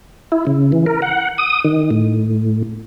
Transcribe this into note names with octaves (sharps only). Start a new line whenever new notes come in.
E4
C#3
E3
A#4
F#5
D#6
D#3
A2